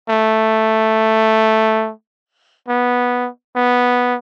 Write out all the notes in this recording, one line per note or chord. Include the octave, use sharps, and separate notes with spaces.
A3
B3
B3